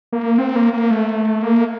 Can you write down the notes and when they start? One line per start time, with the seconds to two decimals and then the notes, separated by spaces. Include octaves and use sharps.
0.12 A#3
0.38 C4
0.56 A#3
0.73 A#3
0.91 A3
1.42 A#3